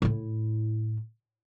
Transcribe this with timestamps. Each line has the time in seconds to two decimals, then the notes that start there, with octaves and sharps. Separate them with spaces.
0.02 A2 E4